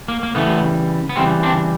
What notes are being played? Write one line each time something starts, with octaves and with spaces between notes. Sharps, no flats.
A#3
A#3
C#3 E3 G3 A3 B3
B3
C#3 E3 G3 A#3 C4
C4 D4